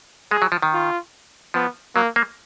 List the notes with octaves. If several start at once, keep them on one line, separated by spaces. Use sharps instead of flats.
G#3 G#4
F#3
F3
D#3
F4
F3 B3
F#3 A#3
A#3